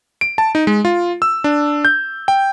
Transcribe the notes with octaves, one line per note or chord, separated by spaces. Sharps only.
D7
A5
D#4
G#3
F4
E6
D4
G6
G5